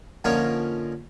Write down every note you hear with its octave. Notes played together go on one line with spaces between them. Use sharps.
D3 F3 A#3 C#4 D#4 C#5